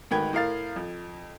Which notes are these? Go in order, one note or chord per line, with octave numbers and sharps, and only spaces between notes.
D2 G#2 D#3 B4 G5 G#6
A2 A#4 F5 A6
F2